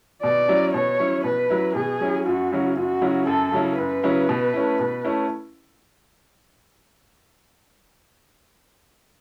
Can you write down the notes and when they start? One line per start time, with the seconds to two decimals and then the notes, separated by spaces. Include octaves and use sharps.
0.23 B2 D5
0.48 F#3 C#4 E4
0.74 B2 C#5
0.99 F#3 C#4 E4
1.24 B2 B4
1.50 F#3 C#4 E4
1.75 B2 G#4
2.01 F#3 C#4 E4
2.26 F#2 F#4
2.52 C#3 F#3 C#4 E4
2.77 F#2 F#4
3.01 C#3 F#3 C#4 E4
3.27 F#2 A4
3.52 C#3 F#3 C#4 E4
3.78 F#2 B4
4.03 C#3 F#3 C#4 E4
4.29 B2
4.54 A3 C#4 E4
4.79 B2
5.05 A3 C#4 E4